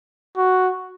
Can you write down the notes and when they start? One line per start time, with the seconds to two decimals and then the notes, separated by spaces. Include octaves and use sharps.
0.37 F#4